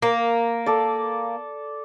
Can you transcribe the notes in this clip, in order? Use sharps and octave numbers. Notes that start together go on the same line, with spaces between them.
A#3
A4 D5